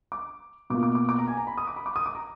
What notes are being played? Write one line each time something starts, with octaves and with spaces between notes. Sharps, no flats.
D6
B2 A#3 F4 D6
D6
D6
D6
A#5
G#5
A#5
B5
D#6
D6
B5
D6
D#6
D6
A#5